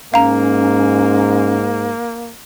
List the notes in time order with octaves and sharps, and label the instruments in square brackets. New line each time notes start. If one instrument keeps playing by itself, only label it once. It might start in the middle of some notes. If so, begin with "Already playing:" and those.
[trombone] G#2 [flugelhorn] A#3 [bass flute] C#4 [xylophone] F5 A#5